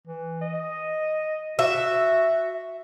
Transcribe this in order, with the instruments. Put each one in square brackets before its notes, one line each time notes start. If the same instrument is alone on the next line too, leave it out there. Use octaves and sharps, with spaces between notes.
[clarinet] E3
D#5
[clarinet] F#4 [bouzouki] E5